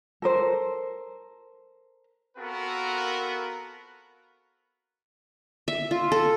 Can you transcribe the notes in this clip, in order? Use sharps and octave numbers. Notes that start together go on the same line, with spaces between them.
A4 A#4 C5
B3 C4 F4 F#4 A4 A#4
E5
F4
A4